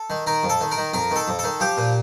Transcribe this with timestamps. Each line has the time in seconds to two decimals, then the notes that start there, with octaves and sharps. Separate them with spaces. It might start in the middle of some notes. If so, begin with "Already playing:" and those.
Already playing: A4
0.10 D#3
0.27 D#3 A#4
0.43 F2
0.49 A4
0.61 D#3
0.71 A#4
0.77 D#3
0.94 F2 A#4
1.11 D#3 A4
1.28 F2
1.39 A4
1.44 D#3
1.60 F3 G4
1.77 A#2